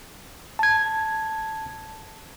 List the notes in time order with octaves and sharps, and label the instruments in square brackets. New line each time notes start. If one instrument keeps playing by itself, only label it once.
[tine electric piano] A5 G#6